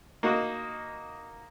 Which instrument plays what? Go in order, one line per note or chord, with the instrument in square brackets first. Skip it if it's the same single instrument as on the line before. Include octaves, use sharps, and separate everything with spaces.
[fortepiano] A#3 D#4 F#4